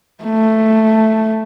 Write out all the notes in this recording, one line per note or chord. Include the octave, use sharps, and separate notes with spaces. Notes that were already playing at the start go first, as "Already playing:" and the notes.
A3